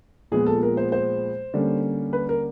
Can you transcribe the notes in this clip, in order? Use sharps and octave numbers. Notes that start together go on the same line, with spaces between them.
A#2 F3 G#3 B3 G#4
A4
A#4
C5
C5
D3 G3 A#3 C#4
B4
A#4